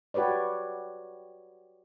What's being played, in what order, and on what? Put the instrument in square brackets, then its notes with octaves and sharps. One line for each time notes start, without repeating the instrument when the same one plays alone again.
[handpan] F#4 G4 B4 C#5 D5